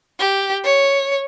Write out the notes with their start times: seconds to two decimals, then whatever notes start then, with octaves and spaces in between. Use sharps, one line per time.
0.20 G4
0.64 C#5